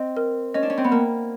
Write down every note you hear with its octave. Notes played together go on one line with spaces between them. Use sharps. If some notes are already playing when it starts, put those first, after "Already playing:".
Already playing: C4 D#5
A#4
C#4 D#5
D4
C#4
C4
B3
A#3 A#4